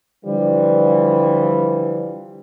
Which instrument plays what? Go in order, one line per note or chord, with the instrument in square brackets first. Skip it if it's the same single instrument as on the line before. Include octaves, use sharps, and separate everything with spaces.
[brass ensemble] D3 E3 F3 G3